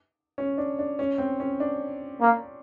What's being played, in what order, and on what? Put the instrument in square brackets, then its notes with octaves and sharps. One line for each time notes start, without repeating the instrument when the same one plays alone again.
[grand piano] C#4
D4
D4
C#4
C4
C#4
D4
[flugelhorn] A#3